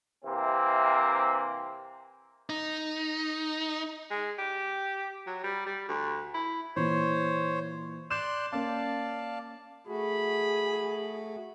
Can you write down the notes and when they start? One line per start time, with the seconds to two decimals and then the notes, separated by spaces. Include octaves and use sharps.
0.25 C3 E3 A#3 C4
2.50 D#4
4.10 G#3
4.39 G4
5.27 F#3
5.43 G3
5.66 G3
5.88 D2
6.34 E4
6.76 A#2 E3 C5 C#5
8.11 D5 C6 F#6 G6 E7
8.52 A#3 C#4 D5 F5 A5
9.87 A3 F#4 G#4 B5